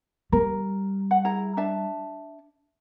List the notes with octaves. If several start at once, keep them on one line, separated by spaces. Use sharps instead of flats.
G3 A#4
F#5
E4 G#4 A#5
D4 E5 A5